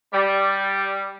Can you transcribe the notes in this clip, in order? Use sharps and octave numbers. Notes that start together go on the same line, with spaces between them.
G3